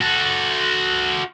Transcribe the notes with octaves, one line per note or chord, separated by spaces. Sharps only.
F#4 A4